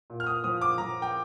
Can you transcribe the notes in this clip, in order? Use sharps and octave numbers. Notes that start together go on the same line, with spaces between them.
A#2
F6
D#6
F3 D#6
D6
F3 A#5
G5